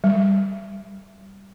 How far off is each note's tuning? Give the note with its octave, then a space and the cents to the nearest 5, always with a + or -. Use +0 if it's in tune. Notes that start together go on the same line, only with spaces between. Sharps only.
G3 -5